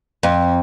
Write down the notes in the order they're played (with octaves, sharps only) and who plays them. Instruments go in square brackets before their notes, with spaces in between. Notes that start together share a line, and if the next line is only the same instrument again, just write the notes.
[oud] F2